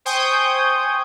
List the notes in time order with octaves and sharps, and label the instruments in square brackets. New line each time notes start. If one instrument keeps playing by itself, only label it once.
[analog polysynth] C5 G5 G#5 C#6 D#6 G6